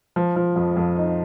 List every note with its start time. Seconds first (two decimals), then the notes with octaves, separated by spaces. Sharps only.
0.16 F3
0.36 F3
0.56 F2
0.77 F2
0.97 D#4